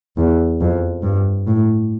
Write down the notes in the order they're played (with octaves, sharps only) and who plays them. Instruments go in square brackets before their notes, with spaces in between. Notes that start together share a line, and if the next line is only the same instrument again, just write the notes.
[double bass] E2
F2
G2
A2